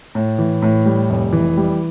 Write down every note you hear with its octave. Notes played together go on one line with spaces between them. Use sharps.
A2
E3
A2
G3
F1
E3
G3